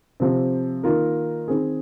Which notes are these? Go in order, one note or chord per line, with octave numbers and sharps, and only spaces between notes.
C3 F3 C4
D#3 A#3 F4 A#4
D#3 C4 G#4